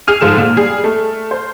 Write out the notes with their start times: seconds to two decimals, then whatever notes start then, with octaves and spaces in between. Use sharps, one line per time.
0.07 G#4 F6 D#7
0.21 G#2 F3 A4 E7
0.37 A#2
0.56 G3 G#4
0.84 A3
1.31 C5